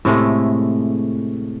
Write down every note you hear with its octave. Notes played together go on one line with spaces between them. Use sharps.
A2 C3 G#3 A3